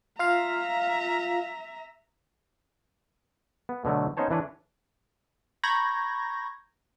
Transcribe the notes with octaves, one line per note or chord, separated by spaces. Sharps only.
F4 E5 F5 A#5
B3
B2 D3 F#3 A3
B3 C#4 D#4 C5 C#5 A5
E3 D4 B4 C#5
A#5 B5 C#6 G6 G#6 A#6